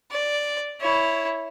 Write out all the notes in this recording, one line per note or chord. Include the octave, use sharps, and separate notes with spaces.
D5
E4 C#5